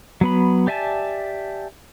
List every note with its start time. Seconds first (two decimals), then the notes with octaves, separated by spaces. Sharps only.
0.21 F#3 B3 B5
0.67 G4 D5 E5 G#5 A5